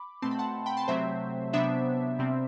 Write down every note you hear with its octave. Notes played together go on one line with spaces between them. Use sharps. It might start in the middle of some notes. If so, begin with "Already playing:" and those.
Already playing: B5 D6
B2 A3 C4 A5 C6
B5
F#5 A5
G5 B5
A5 C6
C3 F#3 A3 C4 C5 E5
C3 F#3 B3 D4 C5 E5
C3 G3 C4